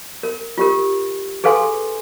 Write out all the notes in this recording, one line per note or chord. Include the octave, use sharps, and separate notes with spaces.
A#4
F4 G4 A#4
G#4 A4 B4 F5 G#5 C6